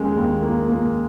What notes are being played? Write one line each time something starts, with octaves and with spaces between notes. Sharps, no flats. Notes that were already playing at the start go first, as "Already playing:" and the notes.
Already playing: D#2 G#3 C#4
D#2
A#3
A#3